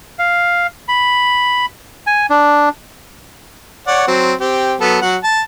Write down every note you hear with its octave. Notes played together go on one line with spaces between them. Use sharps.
F5
B5
G#5
D4
C#5 D5 F#5
F#3 C4
C4 G4
F#3 B3 A4
F#3 F#5
A5